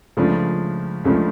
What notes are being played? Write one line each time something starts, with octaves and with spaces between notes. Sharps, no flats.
C#2 C#3 F3 A3 D4
C#2 C#3 F3 A3 D4